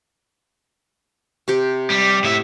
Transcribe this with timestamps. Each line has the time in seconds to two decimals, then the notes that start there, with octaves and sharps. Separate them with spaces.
1.48 C3 G4
1.90 G3
2.24 A2 E5